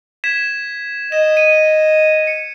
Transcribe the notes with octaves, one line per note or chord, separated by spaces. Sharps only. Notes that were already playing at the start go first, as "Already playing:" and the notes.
G#6 B6 E7
D#5 E7
D#7
C#7